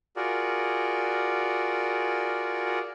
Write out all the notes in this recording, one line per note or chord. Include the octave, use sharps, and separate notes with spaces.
F4 F#4 G#4 A#4 D5